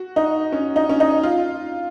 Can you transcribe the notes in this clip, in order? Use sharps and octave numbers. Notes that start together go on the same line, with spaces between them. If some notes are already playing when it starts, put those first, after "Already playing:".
Already playing: F#4
D#4
C#4
D#4
C#4
D#4
F4